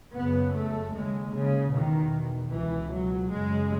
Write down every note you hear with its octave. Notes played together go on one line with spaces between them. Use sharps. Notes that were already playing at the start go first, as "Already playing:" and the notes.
F#2 C#3 B3
A3
D#2 C#3 G#3
C#3
E2 B2 D#3
C#2 B2 E3
F#3
F#2 C#3 G#3